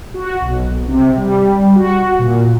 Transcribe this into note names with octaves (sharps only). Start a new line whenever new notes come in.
F#4
B1
C3
G3
F#4
A#2